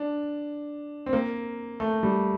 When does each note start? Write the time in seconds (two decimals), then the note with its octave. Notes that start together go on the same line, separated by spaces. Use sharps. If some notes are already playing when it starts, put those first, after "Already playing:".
Already playing: D4
1.06 C4
1.13 A#3
1.80 A3
2.03 G3